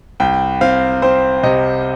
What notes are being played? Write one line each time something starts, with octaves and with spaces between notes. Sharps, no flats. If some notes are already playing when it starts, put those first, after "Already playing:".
C2 G5
C4 F5
C4 C5
C3 D#5